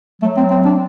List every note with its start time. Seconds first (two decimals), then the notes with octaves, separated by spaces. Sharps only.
0.22 F#3 A3
0.37 C4
0.50 C4
0.65 D4